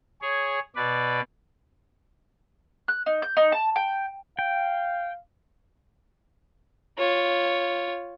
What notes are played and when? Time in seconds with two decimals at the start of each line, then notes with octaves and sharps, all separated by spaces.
0.22 G#4 C#5
0.76 B2 B4 D5
2.88 F#6
3.06 D#4
3.22 G6
3.37 D#4
3.52 A5
3.76 G5
4.39 F5 G5
6.98 F4 C#5